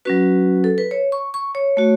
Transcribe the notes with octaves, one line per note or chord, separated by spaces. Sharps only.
F#3 C#4 F#4 B4
A4
B4
C#5
C#6
C#6
C#5
A3 F#4